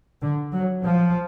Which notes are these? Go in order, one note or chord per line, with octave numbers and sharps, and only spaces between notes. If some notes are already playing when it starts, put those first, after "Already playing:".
D3
F#3
F3